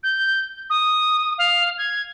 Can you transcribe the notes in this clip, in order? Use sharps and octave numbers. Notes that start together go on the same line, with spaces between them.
G6
D#6
F5
G#6